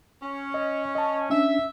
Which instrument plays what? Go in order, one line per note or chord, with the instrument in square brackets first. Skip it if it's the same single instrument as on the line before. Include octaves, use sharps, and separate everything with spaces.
[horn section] C#4
[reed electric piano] D#5
D#5 A5
[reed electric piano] C#4 D4 [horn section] E5